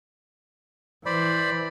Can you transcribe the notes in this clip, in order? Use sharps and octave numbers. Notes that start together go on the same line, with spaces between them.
E3 C5 D5 B5